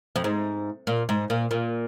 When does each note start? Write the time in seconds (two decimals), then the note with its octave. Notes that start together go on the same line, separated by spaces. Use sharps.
0.16 F2
0.24 G#2
0.87 A#2
1.09 G#2
1.30 A#2
1.51 A#2